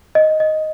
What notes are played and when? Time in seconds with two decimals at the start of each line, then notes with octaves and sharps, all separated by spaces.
0.15 D#5
0.40 D#5